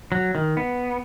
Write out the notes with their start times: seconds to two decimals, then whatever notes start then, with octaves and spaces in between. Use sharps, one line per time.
0.12 F#3
0.35 D#3
0.57 B3